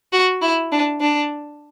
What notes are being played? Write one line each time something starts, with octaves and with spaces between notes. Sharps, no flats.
F#4
E4
D4
D4